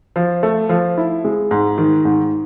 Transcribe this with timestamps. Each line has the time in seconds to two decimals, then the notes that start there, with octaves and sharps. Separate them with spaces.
0.16 F3
0.43 A3
0.69 F3
0.98 E4
1.24 G#3
1.51 G#2
1.78 D#3
2.05 G#2